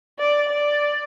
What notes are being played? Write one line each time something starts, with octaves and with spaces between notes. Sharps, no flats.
D5
D5